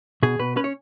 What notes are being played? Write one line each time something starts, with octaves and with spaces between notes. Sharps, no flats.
B2 G#4
B2 B4
C#4 B4
C#5